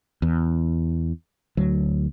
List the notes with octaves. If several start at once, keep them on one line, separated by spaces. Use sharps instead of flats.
E2
D2 F#3